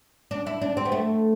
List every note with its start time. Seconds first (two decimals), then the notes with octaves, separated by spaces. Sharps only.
0.31 D4
0.47 E4
0.61 D4
0.77 C4
0.85 B3
0.92 A3